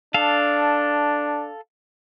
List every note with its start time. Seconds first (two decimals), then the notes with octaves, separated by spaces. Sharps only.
0.14 D4 A4 F5